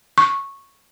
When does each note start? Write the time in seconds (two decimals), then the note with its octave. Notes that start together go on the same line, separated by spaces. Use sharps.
0.18 C#6